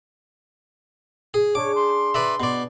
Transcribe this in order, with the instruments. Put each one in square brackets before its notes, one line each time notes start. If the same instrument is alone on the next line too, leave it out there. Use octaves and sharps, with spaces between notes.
[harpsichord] G#4
[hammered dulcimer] D4 G#4 [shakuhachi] C#5 [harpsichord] D6
[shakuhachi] C6
[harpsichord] B4 D5 E5
B2 D5